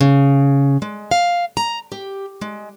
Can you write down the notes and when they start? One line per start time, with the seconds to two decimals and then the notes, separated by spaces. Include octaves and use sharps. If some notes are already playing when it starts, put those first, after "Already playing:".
0.01 C#3
0.82 G#3
1.11 F5
1.57 A#5
1.92 G4
2.41 G#3